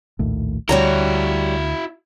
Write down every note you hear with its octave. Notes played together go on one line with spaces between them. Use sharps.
A#1 D#2 A2
D2 G3 E4 F#4 C#5 A#5